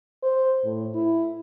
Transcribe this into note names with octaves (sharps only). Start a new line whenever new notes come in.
C5
A2
E4